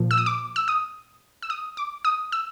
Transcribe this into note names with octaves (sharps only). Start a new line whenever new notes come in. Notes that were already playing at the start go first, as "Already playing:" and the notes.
Already playing: A#2 F3
E6
D#6
D6
E6
D#6
E6
D#6
D6
D#6
E6